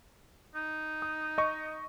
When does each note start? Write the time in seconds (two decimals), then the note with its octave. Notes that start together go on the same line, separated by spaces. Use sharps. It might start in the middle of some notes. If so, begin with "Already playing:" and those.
0.55 D#4
1.02 D#6
1.38 D#5 C#6